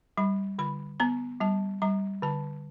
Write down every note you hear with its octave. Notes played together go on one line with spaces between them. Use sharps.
G3 B5
D3 B5
B3 A#5
G3 A5
G3 A#5
D3 A5